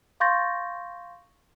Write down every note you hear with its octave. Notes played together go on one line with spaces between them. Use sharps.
F5 C6 C#6 G6 A6 A#6